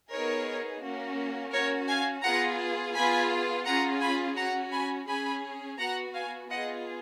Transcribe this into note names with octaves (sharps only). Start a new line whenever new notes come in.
B3 D#4 G#4 A#4 C#5
A#3 C#4 F#4
C#4 F#4 A#4 C#5
F5 G#5
B3 F4 G#4 F#5 A#5
B3 F4 G#4 G#5 B5
C#4 F4 G#4 F#5 A#5
G#5 B5
C#4 F#4 F#5 A#5
G#5 B5
C#4 G#4 G#5 B5
B3 F#4 F#5 A#5
F5 G#5
B3 F4 G#4 D#5 F#5